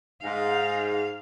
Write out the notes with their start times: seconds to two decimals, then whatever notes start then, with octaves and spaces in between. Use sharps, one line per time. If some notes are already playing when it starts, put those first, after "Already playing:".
0.24 G#2 F5